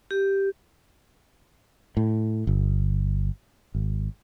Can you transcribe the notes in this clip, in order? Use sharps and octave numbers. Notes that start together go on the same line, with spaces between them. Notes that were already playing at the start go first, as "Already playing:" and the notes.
G4
A2
G1
G#1